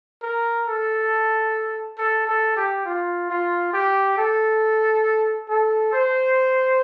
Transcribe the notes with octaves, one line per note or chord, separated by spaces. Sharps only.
A#4
A4
A4
A4
G4
F4
F4
G4
A4
A4
C5